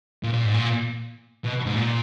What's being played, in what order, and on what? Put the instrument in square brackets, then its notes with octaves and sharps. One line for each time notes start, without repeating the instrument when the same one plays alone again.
[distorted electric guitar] A#2
A#2
G#2
A#2
B2
G#2
A#2